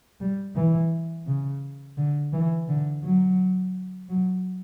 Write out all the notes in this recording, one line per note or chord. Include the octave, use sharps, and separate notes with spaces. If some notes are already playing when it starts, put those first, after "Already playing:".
G3
E3
C#3
D3
E3
D3
F#3
F#3